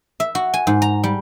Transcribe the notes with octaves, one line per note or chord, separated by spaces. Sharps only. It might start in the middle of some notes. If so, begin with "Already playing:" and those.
E5
F#4
G#5
G#2
A#5
G3